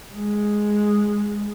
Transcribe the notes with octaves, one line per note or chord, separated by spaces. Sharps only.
G#3